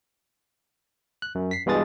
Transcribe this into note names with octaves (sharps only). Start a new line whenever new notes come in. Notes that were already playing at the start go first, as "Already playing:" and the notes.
F#6
F#2
B6 C7
G2 B2 E3 G#3 D#6 A6